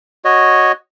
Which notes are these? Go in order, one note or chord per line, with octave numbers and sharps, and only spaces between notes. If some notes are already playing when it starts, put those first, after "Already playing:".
F#4 C#5 D#5